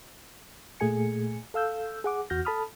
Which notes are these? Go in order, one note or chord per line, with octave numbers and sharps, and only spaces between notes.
A#2 A3 G#4 G#5 C#7
A4 F5 E6 G6
G#4 F#5 D6
E2 F#4 F6 G6 A#6
A4 A5 B5 D#6 F6